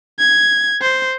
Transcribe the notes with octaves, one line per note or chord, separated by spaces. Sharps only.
G#6
C5